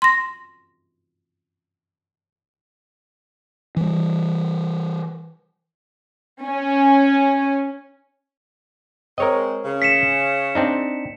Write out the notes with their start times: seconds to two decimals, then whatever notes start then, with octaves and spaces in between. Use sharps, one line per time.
0.02 C6 A#6
3.77 E3 G3
6.45 C#4
9.18 G#3 C4 A#4 C#5 D#5
9.65 C#3
9.82 B6 C#7 E7
10.55 C4 D4 D#4